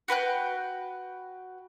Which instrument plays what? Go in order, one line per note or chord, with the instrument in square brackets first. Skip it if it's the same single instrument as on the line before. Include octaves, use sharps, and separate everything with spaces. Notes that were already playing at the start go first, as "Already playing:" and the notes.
[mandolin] F#4 B4 G5 F#6